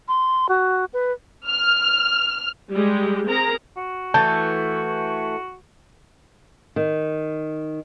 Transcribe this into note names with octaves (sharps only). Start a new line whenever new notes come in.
C6
F#4
B4
F6
G3 G#3 G4
C4 G#4 A#4 A#5
F#4
E3 A3 A5 G6
D#3